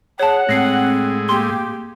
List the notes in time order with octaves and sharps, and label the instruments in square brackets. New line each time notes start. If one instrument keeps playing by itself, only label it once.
[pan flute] G#4 [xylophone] C#5 A5 [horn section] F#5
[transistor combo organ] A2 G#3 [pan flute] C4 [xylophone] A#6 C7
[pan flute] A#3 [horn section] G4 [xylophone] C6